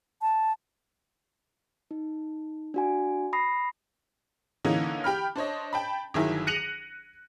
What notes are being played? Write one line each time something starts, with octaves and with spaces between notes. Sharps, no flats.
A5
D#4
D4 F#4 G#5
B5 D#6 A#6 C7
D3 E3 A#3 C#4 D#4
G4 G5 B5 F6
D4 C5 C#5 D#5
G5 A5 B5
G1 D#3 F#3 E4 G#4
F#6 A#6 C#7 D#7 F7 F#7